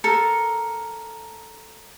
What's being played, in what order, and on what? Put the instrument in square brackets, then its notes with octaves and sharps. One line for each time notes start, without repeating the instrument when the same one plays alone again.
[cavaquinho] A4 A#4